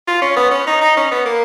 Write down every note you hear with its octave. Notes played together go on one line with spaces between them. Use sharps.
F4
C#4
B3
C#4
D#4
D#4
C#4
B3
A#3